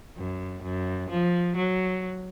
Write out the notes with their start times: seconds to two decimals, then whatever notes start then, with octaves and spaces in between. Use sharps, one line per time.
0.17 F#2
0.62 F#2
1.10 F3
1.56 F#3